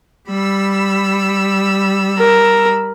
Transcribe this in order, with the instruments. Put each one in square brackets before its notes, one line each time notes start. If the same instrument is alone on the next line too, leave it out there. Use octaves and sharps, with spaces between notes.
[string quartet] G3 B5 E6
[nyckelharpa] A#4